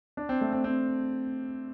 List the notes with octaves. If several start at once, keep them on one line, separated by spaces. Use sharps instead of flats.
D4
C4
A3
C4
C4